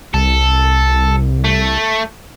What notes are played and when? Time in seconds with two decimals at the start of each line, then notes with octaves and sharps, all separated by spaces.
0.14 C2 A4
1.45 A3